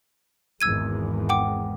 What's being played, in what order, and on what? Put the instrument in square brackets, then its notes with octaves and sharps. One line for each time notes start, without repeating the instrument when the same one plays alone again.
[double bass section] G#1 E2 G#3 [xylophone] E6 G#6 D#7
[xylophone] F#5 G5 D6